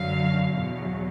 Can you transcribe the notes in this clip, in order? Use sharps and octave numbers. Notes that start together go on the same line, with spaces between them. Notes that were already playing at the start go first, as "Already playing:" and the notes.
Already playing: F#2 D3 F#3 F5
E2 B2 F#3